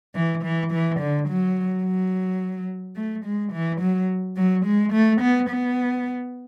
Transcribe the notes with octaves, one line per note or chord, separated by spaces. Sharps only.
E3
E3
E3
D3
F#3
F#3
A3
G#3
E3
F#3
F#3
G#3
A3
B3
B3